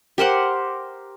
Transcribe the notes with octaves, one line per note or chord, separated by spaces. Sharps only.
G4 A#4 C5 F#5